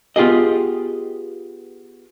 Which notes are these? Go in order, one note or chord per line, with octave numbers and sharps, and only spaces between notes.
B3 F4 G4 G#4 D#5